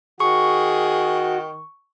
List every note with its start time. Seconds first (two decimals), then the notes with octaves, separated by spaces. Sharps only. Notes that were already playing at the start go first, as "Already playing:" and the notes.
0.20 D#3 F#4 G#4 C#6